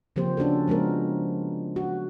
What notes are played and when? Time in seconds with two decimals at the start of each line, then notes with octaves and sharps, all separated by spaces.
0.16 C#3 F3 A#3 C4 G4 C5
0.37 C#4 D4 F#4 A4
0.68 F3 G#3 B3 A#4
1.76 F#4